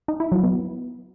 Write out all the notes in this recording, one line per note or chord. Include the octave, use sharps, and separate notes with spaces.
D#4
E4
F#3
B3